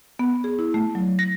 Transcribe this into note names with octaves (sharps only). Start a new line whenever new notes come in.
B3
G#4
E4
A3
F#3
A#6